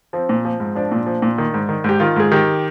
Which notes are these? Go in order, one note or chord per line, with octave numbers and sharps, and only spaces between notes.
F3 C4
A#2
F3
G#2
F3 D4
A#2
F3
A#2
D#3
G#2
D#3
G#2 G4
D#3 F4
G#2 G#4
D#3 G4